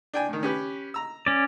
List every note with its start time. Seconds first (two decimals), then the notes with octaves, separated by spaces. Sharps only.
0.14 D4 G5 G#5
0.29 A2 D#3
0.43 C#4 G4 B4
0.94 A#5 E6
1.27 C#4 D5